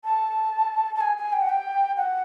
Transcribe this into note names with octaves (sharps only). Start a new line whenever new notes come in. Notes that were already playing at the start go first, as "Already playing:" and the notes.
A5
A5
G#5
G#5
G5
F#5
G5
F#5